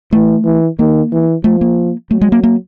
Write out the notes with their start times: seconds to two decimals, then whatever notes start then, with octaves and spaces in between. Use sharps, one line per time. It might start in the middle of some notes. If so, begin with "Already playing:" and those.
0.13 E3 A3
0.45 E3
0.79 D#3 A#3
1.12 E3
1.44 F3 A3
1.61 A#3
2.11 F#3 A3
2.21 G#3
2.32 A#3
2.44 A#3